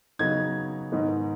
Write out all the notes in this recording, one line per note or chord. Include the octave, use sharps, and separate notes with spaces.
C#3 F#3 B3 D#4 G#6
G#2 D#3 B3 D#4